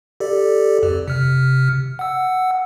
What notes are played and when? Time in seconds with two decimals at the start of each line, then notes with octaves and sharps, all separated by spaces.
0.20 G4 A4 D5
0.83 F2
1.08 C3 F6
1.99 F#5 E6